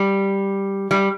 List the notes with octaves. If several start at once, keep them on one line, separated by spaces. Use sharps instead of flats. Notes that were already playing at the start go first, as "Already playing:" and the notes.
Already playing: G3
G3